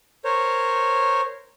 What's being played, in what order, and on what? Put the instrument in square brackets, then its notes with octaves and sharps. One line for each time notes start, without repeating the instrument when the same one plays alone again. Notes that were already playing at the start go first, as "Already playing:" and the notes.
[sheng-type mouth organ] A#4 C5 C#5